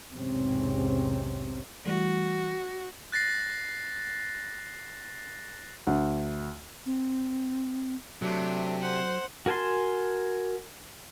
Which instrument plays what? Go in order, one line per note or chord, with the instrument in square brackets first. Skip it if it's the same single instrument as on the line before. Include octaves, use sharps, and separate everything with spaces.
[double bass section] B1 E2 G#2 C3 C4 C#4
[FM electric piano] E3 G3 A3 [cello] F#4
[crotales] F#6 A6 A#6 C7
[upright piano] D2
[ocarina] C4
[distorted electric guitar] C3 [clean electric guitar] F#3 [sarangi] A3 [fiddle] D4
[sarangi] C5 [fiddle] F#5
[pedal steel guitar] F#4 A#4 G#5 A5 C6